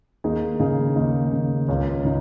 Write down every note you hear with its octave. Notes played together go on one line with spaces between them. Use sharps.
D#2 D#4 G#4
C#3 D#4 G#4
D#2 D#4
C#3
C#2 C#4
C#3 D#4